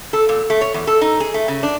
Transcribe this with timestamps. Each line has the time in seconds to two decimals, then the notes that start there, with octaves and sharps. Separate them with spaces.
0.13 A4
0.29 A#2
0.50 A3
0.61 C#5
0.74 E2
0.87 A4
1.01 D#4
1.20 G#4
1.34 A3
1.48 C#3
1.63 D4